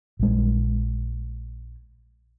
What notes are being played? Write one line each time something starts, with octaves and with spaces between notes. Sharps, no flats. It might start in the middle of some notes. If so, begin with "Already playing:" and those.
A#1 G#3